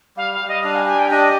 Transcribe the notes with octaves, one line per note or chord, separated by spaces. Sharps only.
G3 F5
F5
G3
D#5
D4 F5
G#5
G4 G#5
G5
D4 D#5